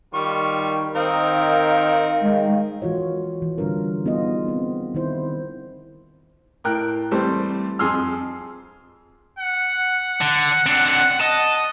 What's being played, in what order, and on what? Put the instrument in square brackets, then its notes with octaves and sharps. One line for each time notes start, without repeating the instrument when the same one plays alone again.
[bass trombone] D#3 [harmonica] G3 F4 C#6
[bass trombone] D#3 [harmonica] C4 D#4 A#4 [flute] F5
[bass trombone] D#3 [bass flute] G#3
[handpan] E3 F4 F#4 C#5
E3
D3 G3 D4 F4 A#4
B3 D#4 F4 G#4 D#5
C4
D#3 C4 E4 C5
[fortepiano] A2 A#4 G5 F#6
E3 G3 A3 C4 C5
F2 F3 G#4 C6 E6 F6
[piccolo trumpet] F#5
[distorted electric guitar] D3
C4 D4
[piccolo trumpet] D#5 [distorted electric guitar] A5